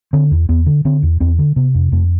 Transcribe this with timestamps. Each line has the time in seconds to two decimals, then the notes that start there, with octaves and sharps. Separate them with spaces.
0.13 D3 C4
0.31 E2
0.49 E2 B3
0.66 D3
0.85 D3 C4
1.03 E2
1.20 E2 C4
1.39 D3
1.56 C3 B3
1.75 F2
1.92 F2 A3